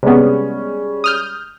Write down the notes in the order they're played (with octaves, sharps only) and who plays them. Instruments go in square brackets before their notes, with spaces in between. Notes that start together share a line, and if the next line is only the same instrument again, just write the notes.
[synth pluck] C3 B3 [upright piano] G3 G#3 C#4
[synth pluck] D#6 F6 G6